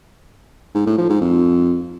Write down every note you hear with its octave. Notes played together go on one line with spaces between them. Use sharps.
G#2
A2
F3
G#2
F2